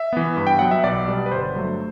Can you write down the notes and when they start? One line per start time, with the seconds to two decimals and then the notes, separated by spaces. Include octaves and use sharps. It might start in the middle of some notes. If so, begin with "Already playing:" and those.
Already playing: E5
0.13 E3 B3
0.37 G2
0.47 G5
0.59 F#3 B3 F#5
0.71 E5
0.83 B1 D5
1.07 B2 G3 B3
1.26 B4
1.31 G1 C5
1.55 G2 F#3 A3